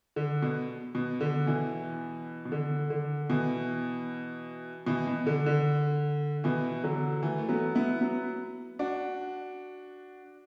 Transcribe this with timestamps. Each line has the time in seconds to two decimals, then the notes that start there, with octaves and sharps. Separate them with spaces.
0.16 D3
0.42 B2
0.95 B2
1.21 D3
1.46 B2 E3
2.45 B2
2.52 D3
2.90 D3
3.30 B2 E3
4.87 B2 E3
5.07 B2
5.27 D3
5.46 D3
6.44 B2 E3
6.84 D3 F#3
7.23 E3 A3
7.38 A3
7.49 F#3 B3
7.75 B3 E4
8.01 F#3 B3
8.79 D4 F#4